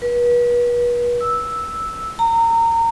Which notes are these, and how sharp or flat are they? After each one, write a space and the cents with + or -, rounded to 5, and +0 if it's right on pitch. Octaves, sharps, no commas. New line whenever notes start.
B4 -35
E6 -5
A#5 -25